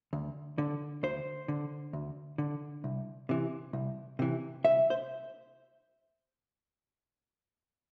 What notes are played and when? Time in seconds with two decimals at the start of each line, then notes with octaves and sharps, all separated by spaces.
0.13 D2
0.58 D3
1.03 D2 C5
1.48 D3
1.93 D2
2.38 D3
2.84 C2
3.29 C3 E3
3.73 C2
4.19 C3 E3
4.64 C2 E5
4.90 C5